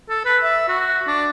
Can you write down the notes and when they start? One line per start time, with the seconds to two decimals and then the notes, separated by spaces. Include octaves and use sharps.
0.10 A4
0.25 B4
0.43 E5
0.68 F#4
1.07 D4